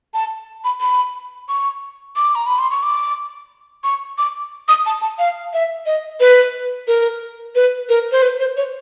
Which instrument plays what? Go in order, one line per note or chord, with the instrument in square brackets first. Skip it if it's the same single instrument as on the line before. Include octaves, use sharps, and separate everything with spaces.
[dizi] A5
B5
B5
C#6
D6
A#5
B5
C6
C#6
D6
C#6
D6
D#6
A5
A5
F5
E5
D#5
B4
A#4
B4
A#4
C5
B4
C5
C#5